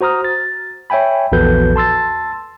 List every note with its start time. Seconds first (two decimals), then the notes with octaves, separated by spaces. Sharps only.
0.01 F#4 C5 A#5 D#6 F6
0.25 A6
0.90 C#5 E5 G5 G#5 B5
1.32 A#1 E2 F#4 A4 B4 G6
1.76 A5 C6 E6 A6